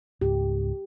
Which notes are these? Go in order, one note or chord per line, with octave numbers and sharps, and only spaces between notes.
C#2 G#2 G4